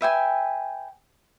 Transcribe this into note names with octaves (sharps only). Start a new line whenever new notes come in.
B4 E5 G5 G#5